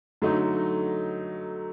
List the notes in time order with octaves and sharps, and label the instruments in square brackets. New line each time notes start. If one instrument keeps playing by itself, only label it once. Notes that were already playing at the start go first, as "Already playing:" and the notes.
[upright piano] D3 F#3 A3 D#4